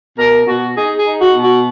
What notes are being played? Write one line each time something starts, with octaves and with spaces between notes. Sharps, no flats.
B2 A#4
B2 F#4
D#4 G#4
G#4
D#4
F#4
B2
F#4